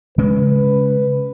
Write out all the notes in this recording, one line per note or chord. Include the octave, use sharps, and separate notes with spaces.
C#3 G#3 C#4 B4